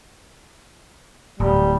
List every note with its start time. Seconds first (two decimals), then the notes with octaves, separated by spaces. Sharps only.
1.39 D1 G3